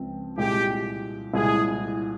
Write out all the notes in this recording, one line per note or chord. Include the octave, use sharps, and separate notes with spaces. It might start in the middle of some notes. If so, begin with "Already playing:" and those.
Already playing: C#2 C#3 F3 C4
C2 A#2 G#3 G4
C2 A#2 G#3 E4 G#4